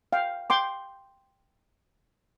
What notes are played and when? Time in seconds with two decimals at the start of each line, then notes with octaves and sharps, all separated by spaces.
0.13 F5 G5
0.50 G5 C6 D6